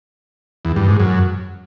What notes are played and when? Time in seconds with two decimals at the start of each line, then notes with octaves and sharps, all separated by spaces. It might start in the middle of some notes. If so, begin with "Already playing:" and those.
0.65 E2
0.76 G2
0.88 G#2
1.00 F#2